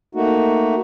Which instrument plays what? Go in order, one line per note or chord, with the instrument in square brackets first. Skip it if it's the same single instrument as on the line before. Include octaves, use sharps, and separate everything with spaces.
[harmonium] A3 A#3 D#4 F#4